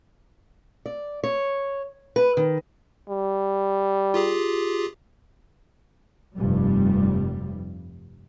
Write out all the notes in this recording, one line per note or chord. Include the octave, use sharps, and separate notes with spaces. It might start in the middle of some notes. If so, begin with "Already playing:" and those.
D5
C#5
B4
D#3
G3
F4 G4 G#4
F1 G2 G3